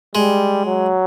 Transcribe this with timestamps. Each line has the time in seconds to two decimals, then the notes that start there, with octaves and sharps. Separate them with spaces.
0.15 G3 G#3
0.65 F#3